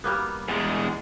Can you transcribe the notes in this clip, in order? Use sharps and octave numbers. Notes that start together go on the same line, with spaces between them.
G3 A#3 B3
E2 G#3